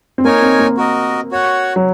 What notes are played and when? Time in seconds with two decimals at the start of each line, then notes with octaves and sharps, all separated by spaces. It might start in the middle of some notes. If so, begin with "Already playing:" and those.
0.18 C4
0.25 A#3 D#4 A#4 C#5 G#5
0.42 C4
0.59 A#3
0.77 F#4 A#4 D#5
1.31 F#4 C#5 F#5
1.76 F#3